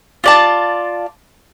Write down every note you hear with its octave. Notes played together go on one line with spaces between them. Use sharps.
F4 D5 A5